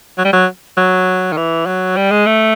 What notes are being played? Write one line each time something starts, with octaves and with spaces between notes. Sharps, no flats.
F#3
G3
F#3
F#3
D#3
E3
F#3
G3
G#3
A3